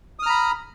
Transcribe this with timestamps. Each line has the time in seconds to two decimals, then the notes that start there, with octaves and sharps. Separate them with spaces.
0.19 D#6
0.23 F6
0.26 A#5
0.30 B5